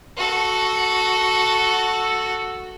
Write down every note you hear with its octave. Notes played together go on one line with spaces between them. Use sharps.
F#4 A4